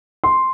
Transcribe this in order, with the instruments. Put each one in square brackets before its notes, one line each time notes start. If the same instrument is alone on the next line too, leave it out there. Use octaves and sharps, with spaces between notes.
[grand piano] C6